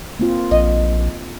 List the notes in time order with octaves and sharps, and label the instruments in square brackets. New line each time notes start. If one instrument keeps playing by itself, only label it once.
[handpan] A#3 C4 F4
[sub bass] A#1 [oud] D#5